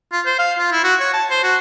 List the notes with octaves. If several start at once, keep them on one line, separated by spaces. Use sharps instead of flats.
F4
C5
F5
F4
E4
F#4
C#5
A5
C5
F#4